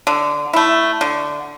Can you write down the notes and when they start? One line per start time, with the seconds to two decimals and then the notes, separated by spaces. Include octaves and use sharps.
0.07 D3
0.53 A3 E4
1.01 D3